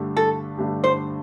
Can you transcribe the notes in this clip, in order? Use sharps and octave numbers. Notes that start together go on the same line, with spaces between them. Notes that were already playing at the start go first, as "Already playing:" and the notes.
Already playing: G2 D3 A3 D4 G4
A4
G2 D3 A3 D4 G4
C5